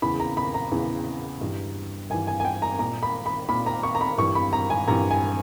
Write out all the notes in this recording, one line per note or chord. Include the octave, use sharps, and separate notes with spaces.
E2 C#3 E3 B5
A#5
B5
A#5
E2 C#3 E3
G2 E3
G2 E3 G#5
G#5
G#5
G5
A#5
A#2 A#5
B5
B5
A#2 B5
A#5
C#6
A#5
B5
G2 E3 C#6
B5
A#5
G#5
G2 E3 A#5
G#5